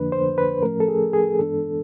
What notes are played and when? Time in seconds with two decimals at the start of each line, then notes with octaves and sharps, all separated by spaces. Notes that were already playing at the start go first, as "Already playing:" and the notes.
Already playing: F2 D3 F3 A#3 D4 B4
0.12 C5
0.38 B4
0.63 A2 F3 A3 C#4 A#4
0.80 A4
0.88 G#4
1.13 G#4
1.39 G2 E3 G#3 B3 D4 A4